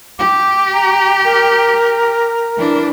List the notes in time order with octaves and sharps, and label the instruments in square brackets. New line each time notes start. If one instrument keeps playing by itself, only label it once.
[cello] G4 [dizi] D6
[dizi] A#5
A#4
[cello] E3 D4